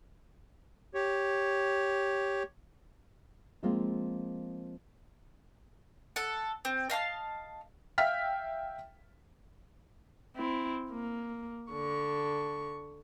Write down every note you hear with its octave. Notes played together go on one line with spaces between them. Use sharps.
G4 C#5
F3 G#3 A#3 C4 F4
A4 F#5
C4
D#5 F5 A5 F6
E5 F5 G5 F6 B6
C4 E4
A#3
D3 C#6